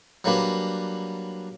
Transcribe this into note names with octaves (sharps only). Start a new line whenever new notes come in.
F#3 G3 A#3 D4 B4